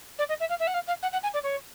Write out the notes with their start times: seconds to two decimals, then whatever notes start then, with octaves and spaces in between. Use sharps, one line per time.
0.18 D5
0.29 D#5
0.40 E5
0.49 F5
0.59 E5
0.67 F#5
0.74 F5
0.87 F5
1.02 F#5
1.12 F#5
1.23 G#5
1.33 D5
1.43 C#5